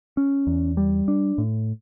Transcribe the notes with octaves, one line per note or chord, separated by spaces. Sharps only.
C#4
E2
G3
D4
A2